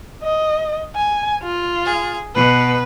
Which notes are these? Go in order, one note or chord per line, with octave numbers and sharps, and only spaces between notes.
D#5
G#5
F4
G#4
B2 B4